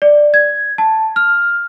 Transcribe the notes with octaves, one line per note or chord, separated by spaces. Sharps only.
D5
G#6
A5
F6